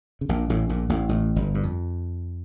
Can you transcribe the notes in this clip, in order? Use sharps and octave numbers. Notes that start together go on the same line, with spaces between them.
C#3
A#1 A#2
A1 A2
A#1 A#2
A1 A2
A1 A2
G1 G2
G2
F2